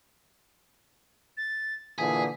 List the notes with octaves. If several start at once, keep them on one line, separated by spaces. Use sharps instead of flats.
A6
A#2 D3 E3 G#4 B6